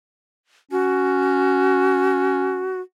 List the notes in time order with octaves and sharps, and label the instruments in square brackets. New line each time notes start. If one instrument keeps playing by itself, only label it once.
[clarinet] C#4 [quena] F#4